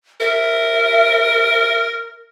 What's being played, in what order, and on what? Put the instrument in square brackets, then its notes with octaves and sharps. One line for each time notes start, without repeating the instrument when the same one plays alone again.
[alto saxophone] A#4 [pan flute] E5